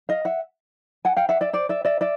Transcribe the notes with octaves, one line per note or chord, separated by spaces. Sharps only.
D#5 F5
E5 F#5
F#5 G#5
F5 G5
E5 F#5
D5 E5
C5 D5
D5 E5
D5 E5
D5 E5